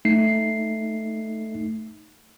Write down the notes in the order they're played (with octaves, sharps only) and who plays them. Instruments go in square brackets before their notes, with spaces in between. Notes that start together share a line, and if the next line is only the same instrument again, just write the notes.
[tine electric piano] A3 D#4 C7